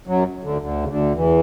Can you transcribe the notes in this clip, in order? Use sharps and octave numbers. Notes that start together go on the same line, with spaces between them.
F#2 F#3
D2 D3
D2 D3
C#3
D2 D3
E2 E3